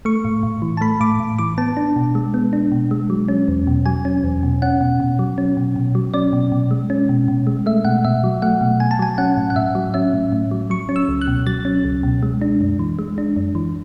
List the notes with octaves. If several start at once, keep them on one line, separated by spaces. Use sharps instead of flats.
A3 C#6
A2
A2
E3
A5
A3 B5
A2 D6
A2
E3 D6
B3 A5
D4
B2
G#3
B3
D4
B2
G#3
F#3
C#4
E2
B2
F#3 G#5
C#4
E2
B2
C#4 F#5
B2
B2
F#3
C#4
B2
B2
F#3
C#4 D5
B2
B2
G#3
C#4
B2
B2
G#3
A3 E5
B2 F#5
B2 E5
F#3
A3 F#5
B2
B2 G#5
A5
F#3 G#5
C#4 F#5
A2
F#5
A2 E5
F#3
C#4 E5
A2
A2
F#3
F#3 C#6
C#4
E6
C#2
F#6
B2
F#3 A6
C#4
C#2
B2
G#3
D4
F#2
E3
G#3
D4
F#2
E3